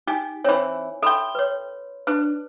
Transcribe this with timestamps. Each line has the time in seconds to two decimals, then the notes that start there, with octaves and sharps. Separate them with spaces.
0.07 D#4 G4 G#5
0.44 E3 C4 C#5
1.02 A4 E5 G5 B5 C6
1.35 B4 C#5
2.07 D4 B4